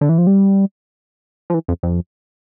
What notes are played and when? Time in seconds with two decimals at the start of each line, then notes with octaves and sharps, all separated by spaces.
0.01 D3
0.09 E3
0.18 F3
0.27 G3
1.50 F3
1.54 E3
1.68 F2
1.83 F2